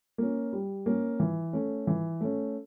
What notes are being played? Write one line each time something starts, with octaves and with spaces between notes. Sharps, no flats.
A#3 C#4
G3
A#3 C#4
E3
A3 C#4
E3
A3 C#4